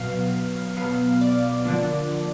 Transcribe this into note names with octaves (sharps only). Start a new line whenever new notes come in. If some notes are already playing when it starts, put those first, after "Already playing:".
Already playing: B2 F#3 B3 F5
B2 F#3 B3 F5
D5
D3 F3 A#3 D4